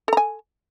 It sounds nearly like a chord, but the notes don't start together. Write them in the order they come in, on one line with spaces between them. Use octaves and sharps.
A4 A#5 G#5